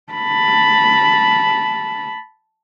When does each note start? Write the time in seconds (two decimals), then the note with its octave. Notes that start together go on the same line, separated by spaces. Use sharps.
0.13 A5 B5